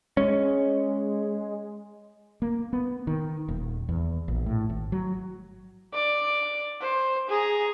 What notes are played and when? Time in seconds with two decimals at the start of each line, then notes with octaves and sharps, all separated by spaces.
0.17 G#3 C#4
2.42 A#3
2.73 B3
3.07 D#3
3.48 D#1
3.89 E2
4.28 A#1
4.46 A2
4.69 G#1
4.92 F#3
5.93 D5
6.81 C5
7.28 G#4 A#5